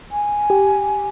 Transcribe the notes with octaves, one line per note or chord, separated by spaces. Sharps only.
G#5
G4